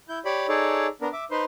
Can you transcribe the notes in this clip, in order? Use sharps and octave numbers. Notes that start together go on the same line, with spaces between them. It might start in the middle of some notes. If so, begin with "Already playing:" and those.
E4 G6
G4 C#5 D5 B5
D#4 G#4 A4 C#5 D5
B3 D4 A#4
E5 D6
D#4 B4 C5 C6